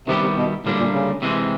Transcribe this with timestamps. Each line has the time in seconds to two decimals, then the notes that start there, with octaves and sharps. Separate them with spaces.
0.07 C3 D#3 G3 B3 E4 G4
0.22 C3
0.36 B2
0.64 D2 A2 D3 G3 A#3 D4
0.79 A#2
0.93 C#3
1.22 C3 E3 G#3 C4